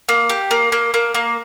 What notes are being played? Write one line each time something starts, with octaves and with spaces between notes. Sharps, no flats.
A#3
G4
A#3
A#3
A#3
A#3